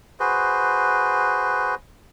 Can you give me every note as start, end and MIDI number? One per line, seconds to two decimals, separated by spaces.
0.20 1.75 66
0.20 1.75 68
0.20 1.75 71
0.20 1.75 72